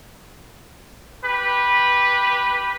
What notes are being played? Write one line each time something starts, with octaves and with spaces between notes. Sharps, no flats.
G4 B4